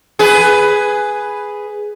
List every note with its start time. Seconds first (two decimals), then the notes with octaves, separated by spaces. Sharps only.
0.19 G#4 B4